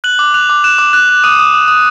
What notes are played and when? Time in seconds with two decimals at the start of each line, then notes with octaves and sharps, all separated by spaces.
0.04 F#6 F#7
0.19 D6
0.34 F#6 F7
0.49 D6
0.64 F#6 E7
0.78 D6
0.93 F#6
1.09 F#6
1.24 D#6 D#7
1.39 D#6
1.54 D#6
1.68 D#6